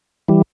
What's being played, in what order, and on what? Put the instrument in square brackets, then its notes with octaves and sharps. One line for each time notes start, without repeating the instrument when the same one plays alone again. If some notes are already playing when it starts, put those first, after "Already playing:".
[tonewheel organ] E3 G3